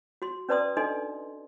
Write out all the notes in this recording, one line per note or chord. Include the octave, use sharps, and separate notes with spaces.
F#4 C6
C#4 B4 D5 A5 C6 D#6
D4 D#4 A4 D#5 C6